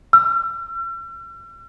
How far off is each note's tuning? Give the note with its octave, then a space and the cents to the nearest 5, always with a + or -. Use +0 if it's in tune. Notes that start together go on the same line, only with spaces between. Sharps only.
E6 +45